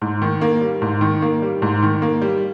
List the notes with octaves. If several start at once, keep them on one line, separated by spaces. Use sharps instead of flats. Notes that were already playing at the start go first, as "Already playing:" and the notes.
G#2
D#3
A#3
G3
G#2
D#3
A#3
G3
G#2
D#3
A#3
G3